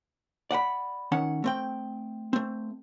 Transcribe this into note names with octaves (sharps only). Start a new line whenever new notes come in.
D5 F#5 G5 B5
D#3 C#4 F#5
A3 C4 G5
A3 C4